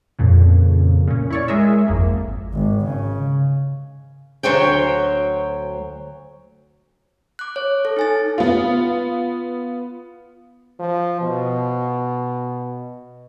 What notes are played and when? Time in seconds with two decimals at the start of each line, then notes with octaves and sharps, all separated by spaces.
0.19 F2 A#2 C#3
1.08 A#2 C#4
1.30 E4 C#5 D5
1.48 G#3 G#4 A#4 E5
1.88 G#1 F2 A#3
2.54 G#1
2.86 C#3
4.43 D2 F#3 C5 C#5 G5
7.39 D6 F#6
7.56 C#5
7.85 A4
7.97 D#4 G#5 A6
8.38 B3 F4
10.80 F3
11.22 B2